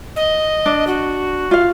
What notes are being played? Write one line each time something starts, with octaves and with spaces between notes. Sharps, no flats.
D#5
D4
F#4
F4 F5